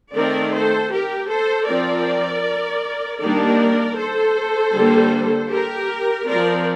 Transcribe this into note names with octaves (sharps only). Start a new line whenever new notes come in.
D#3 A3 C4 A#4 D5
A4 C5
G4 A#4
A4 C5
F3 C4 A#4 D5
D#3 G3 A#3 D4 A#4 D5
A4 C5
D3 G3 A#3
G4 A#4
F3 C4 A#4 D5